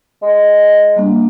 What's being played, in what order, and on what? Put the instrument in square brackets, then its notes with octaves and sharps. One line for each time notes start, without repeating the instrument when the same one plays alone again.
[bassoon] G#3
[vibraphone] G3 A#3 D4